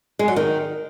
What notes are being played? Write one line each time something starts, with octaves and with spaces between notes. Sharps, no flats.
G#3
F#3
D#3